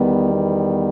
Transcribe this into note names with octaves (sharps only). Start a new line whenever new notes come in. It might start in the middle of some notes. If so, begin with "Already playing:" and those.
Already playing: E2 D#3 G3 B3
B3